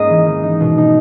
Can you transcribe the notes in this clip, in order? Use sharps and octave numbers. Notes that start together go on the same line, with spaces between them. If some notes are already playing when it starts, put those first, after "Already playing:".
Already playing: G#2 G#3 A#3 C#4 D#5 A#5
E3
D#3
D#4
B2
D#4